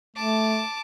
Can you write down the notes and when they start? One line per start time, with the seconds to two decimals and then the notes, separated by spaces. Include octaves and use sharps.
0.16 A3 A5 D6